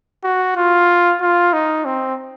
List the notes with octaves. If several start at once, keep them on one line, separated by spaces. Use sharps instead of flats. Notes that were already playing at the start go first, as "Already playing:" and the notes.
F#4
F4
F4
D#4
C4